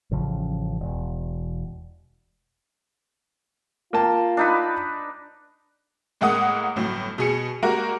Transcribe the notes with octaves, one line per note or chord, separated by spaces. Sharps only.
A1 C#3 F3
E1
A#3 F4 G5 A5
D4 D#4 B4
A2 G#3 A#3 F#5 D#6
G1 A2 F#3
B2 G#4 C#7
G#3 A#3 F#4 G4 A#4